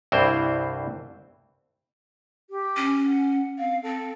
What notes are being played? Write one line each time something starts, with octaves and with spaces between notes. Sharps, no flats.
C2 G2 E3 C4 C5
G4
C#4
F#5
C4 F5
C4 A4